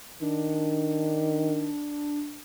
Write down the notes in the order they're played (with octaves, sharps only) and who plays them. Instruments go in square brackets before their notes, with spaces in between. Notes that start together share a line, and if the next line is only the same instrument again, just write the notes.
[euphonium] D#3 [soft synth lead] D4